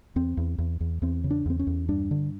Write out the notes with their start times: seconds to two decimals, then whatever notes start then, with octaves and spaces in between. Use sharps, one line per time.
0.16 E2 C4
0.37 E2
0.58 E2
0.80 E2
1.02 E2 C4
1.24 C#3
1.31 D4
1.46 E2 C4
1.59 C#4
1.67 E2
1.89 G2 D4
2.11 D3